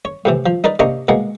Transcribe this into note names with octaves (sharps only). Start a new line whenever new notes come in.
C#5
A2 C3 E3
F3
D#4 A#4 B4 D5
C3 A#3 D4 D#5 A#5 C#6
B2 G#3 A#3 F#5